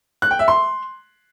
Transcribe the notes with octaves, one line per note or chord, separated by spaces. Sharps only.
F#6
G5
E5
C6